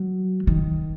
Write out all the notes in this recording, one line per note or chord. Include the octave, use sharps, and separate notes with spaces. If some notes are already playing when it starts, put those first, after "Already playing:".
Already playing: F#3
D#3